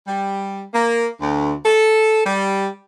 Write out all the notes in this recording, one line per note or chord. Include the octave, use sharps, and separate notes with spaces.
G3
A#3
D2
A4
G3